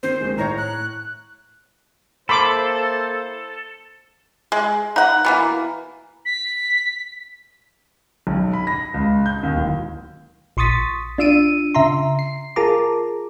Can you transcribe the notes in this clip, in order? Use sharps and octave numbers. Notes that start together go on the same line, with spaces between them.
D#3 C4 C5
D#3 G#3
A2 C#5 A#5
F#6
A#3 E4 A4 C5 B5 C6 D6
G#3
D#4 F#5
B2 E3 A#3
B6
B1
B5
A#6
C#2
G6
D#2
D1
A#1 C6 C#6 D#6 A6 B6
D4 F4 E6 D7 D#7
C#3 E5 A#5 C6
C7
F4 G#4 A#4 A5 A#5 D6